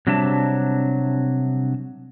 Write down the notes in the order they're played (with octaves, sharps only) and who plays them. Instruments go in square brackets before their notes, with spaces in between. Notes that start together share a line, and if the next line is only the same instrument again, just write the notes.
[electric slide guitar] C3 F#3 G3 D4 E5 A5